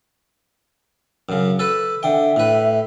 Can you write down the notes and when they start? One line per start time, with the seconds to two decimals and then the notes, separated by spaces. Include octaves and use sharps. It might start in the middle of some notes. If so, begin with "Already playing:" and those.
1.29 F#2 C#3
1.59 A4 B4
2.03 D3 E5 G5
2.36 A2 B4